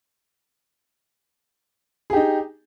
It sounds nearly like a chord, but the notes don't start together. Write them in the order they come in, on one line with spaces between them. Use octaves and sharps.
G#4 G4 D#4